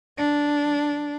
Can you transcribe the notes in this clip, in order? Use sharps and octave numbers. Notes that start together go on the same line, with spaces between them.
D4